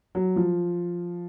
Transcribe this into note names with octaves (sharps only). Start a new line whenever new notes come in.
F#3
F3